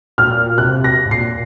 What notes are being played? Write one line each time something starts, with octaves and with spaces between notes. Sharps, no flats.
A#2 F6
C3 F#6
A#6
G#2
A#2 C7